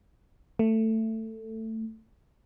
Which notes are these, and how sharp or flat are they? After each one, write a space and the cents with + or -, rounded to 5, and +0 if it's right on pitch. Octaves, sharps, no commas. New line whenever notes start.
A3 +15